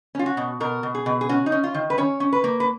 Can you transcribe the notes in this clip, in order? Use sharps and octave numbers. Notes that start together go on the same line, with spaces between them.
C#4 F4
F#4
B2
B2 A#4
B2
G#4
B2
G#4
C#4 F#4
D#4
C#4
F4
D#3
B4
C#4 C#5
C#4
B4
A#3
B4